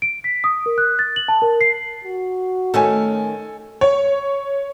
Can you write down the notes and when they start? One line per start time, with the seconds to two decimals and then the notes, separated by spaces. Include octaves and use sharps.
0.02 D7
0.24 B6
0.44 D#6
0.66 A#4
0.78 F#6
0.99 A6
1.16 F#7
1.28 A5
1.42 A#4
1.61 C7
2.04 F#4
2.74 D#3 A3 C#4 A4 G#5
3.81 C#5